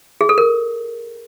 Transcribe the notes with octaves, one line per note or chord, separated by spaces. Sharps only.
G#4
A4
A#4